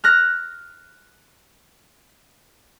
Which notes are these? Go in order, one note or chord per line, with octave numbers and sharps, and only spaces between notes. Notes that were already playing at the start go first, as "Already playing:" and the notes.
F6 F#6 A#6